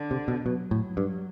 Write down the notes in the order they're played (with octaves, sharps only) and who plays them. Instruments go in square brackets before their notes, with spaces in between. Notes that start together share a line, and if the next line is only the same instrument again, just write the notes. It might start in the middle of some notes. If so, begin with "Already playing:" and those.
Already playing: [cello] D3
[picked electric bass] C3
B2
[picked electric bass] B2 [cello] F#3
[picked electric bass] A2
G2